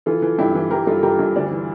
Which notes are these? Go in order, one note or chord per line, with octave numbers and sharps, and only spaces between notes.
E3 F4 A4
E3
G2 E4 G4
E3
E3 G4 A#4
G2 F4 A4
G2 G4 A#4
G2
D2 D4
E3